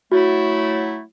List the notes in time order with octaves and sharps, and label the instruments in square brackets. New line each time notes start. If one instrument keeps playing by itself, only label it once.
[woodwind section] F#3 A3 E4 [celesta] F#4